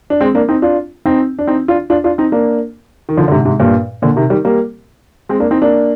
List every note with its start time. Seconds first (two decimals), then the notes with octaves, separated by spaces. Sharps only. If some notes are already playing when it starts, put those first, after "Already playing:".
0.10 D4
0.21 G#3 C4
0.35 A#3 D4
0.48 C4 D#4
0.62 D4 F4
1.06 C4 D#4
1.39 D4
1.47 C4 D#4
1.68 D4 F4
1.90 D4 F4
2.04 D4 F4
2.18 C4 D#4
2.32 A#3 D4
3.09 D#3
3.17 D3 F3
3.28 D3
3.31 G#2 C3
3.45 G#2 C3
3.60 G2 A#2
4.02 A#2 D3
4.16 C3 D#3
4.30 D#3 G3
4.45 G3 A#3
5.29 G#3 C4
5.40 A#3 D4
5.51 C4 D#4
5.62 A#3 D4